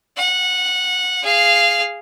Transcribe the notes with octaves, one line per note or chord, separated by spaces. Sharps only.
F#5
G#4 F5